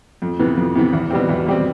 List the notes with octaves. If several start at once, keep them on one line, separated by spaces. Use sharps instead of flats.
F2
C3 E3 B3
F2
C3 E3 B3
E2
B2 G3 C4
E2
B2 G3 C4